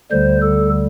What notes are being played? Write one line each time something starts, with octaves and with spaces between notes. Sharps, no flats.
D2 D3 G3 C5
A4